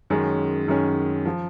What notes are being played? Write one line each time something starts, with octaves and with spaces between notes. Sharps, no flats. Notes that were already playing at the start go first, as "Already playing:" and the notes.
F#2 D#3 G#3 C#4 G#4
F#2 D#3 G#3 C#4 G#4
F3